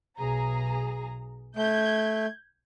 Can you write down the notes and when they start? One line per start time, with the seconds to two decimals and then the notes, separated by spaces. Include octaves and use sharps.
0.17 B1 G#4 A#5
1.56 A3 G6 G#6